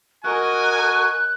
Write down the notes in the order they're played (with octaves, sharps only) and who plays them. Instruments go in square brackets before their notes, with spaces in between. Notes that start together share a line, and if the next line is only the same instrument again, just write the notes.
[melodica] F#4 [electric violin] A#4 D#5 [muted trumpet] G#5 [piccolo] F#6